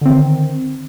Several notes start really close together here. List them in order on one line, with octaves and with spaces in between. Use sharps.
D3 C4 D#3